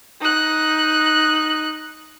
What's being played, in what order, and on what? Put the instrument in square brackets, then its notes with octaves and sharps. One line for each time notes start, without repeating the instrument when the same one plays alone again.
[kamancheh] D#4 F#6